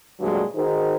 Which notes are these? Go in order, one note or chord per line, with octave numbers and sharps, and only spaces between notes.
D2 G2 A#2 F#3 G#3 F#4
D#3 D#4 F#4 G#4 A#4 C5